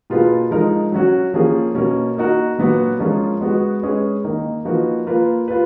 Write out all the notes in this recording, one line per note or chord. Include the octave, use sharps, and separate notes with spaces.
B2 A#3 F4 G#4 B4
F3 G#3 D#4 A#4
F#3 C#4 F#4
F3 A#3 C#4 G#4
B2 A#3 C#4
A#3 D#4 F#4 A#4
A#2 F#3 B3 F#4
F3 G#3 C#4 F4 A#4
G#3 B3 F#4
G#3 C#4 G#4 B4
D#3 A#3 D#4
F3 A#3 D#4 F#4 B4
A#3 F4 B4
F4 B4